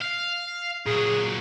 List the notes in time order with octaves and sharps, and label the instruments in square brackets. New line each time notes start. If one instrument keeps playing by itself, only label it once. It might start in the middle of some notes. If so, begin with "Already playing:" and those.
[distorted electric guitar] F5
[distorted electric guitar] A#2 F#3 [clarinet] G#4